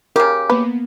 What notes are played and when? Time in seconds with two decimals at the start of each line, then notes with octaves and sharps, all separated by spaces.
0.16 C#3 G4 A#4
0.50 A#3 B3 B4